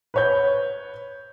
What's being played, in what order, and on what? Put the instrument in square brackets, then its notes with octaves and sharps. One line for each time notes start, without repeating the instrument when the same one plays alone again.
[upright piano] B4 C#5 G6